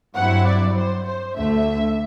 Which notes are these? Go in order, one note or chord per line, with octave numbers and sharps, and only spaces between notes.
G2 F#3 C4 E4 F#5
D5
C5
C5
D2 D3 A3 E5